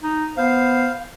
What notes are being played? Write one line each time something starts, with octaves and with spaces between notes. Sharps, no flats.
D#4
B3 C5 F5